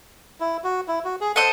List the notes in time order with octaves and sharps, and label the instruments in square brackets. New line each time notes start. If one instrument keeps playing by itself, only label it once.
[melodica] E4
F#4
E4
F#4
G#4
[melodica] A4 [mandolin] C5 D#5 F#5